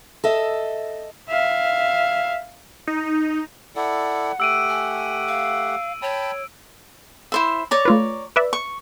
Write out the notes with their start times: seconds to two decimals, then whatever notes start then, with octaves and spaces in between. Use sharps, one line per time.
0.24 A4 D#5 E5
1.29 E5 F5
2.87 D#4
3.76 E4 A4 D5 F#5
4.40 A3 G4 F#5 E6 D7 D#7
4.69 G#5
5.28 F5
6.02 C#5 G5 A5 B5
7.32 E4 C5 E5
7.71 C#5 D5 A#5
7.85 A3 F4 B4
8.36 B4 D5 E5
8.53 C#6